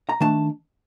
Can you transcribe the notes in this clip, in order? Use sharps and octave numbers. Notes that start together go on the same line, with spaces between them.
A#5
D#3 A3 D4 A5